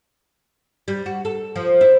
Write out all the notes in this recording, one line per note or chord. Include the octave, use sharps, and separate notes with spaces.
G3
F#4
A4
F3
E4